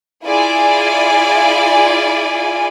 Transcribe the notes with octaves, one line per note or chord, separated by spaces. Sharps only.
E4 F4 G#4 D5 G#5